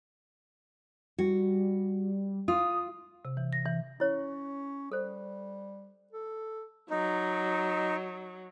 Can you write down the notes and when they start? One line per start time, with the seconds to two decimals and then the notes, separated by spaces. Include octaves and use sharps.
1.18 G3 F#4
2.48 F4 D#6
3.25 C3
3.37 E3
3.53 A#6
3.65 E3
4.00 C#4 E4 C#5
4.92 G3 A4 C5
6.13 A4
6.90 F#3 D#4